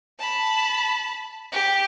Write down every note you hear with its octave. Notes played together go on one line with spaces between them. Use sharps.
A5 B5
G4